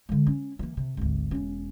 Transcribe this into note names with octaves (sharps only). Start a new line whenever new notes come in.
D3 G#3
C#4
E3 A#3
C3
G#1 D2
E1 C#4